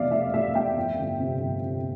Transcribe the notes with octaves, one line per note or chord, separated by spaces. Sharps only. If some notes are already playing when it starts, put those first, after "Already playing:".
Already playing: F1 E2 B2 D5 E5 F5
A3 E5
A3 E5
A3 E5 G5
F2
G1
C3
G1
C3